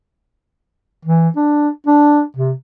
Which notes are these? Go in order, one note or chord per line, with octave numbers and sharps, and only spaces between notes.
E3
D4
D4
C3